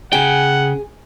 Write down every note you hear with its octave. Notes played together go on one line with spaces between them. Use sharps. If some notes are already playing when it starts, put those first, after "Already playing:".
C#3 G#4 F#5 G5